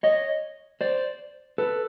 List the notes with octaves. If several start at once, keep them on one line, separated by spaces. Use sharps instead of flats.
C#5 D#5
C5 D5
A4 B4